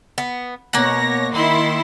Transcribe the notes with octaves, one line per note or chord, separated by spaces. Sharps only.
B3
B2 A#3 C#5 F#5 A#6
D#3 E4 C6